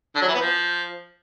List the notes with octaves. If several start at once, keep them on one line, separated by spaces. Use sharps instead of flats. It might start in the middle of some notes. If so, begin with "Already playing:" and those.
D3
F#3
E3
B3
F3